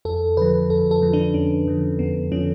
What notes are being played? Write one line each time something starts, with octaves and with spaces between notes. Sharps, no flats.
F2 A4
D3 F3 B4
F2 A4
A4
D3 F3
D4
F2 C#4
D3 F3
F2 B3
D3 F3 C#4